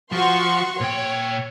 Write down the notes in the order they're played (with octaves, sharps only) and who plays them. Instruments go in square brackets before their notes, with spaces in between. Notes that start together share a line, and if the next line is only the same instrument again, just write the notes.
[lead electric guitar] F3 [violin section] F#4 C6 C#6
[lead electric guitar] A#2 G5 [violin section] C#5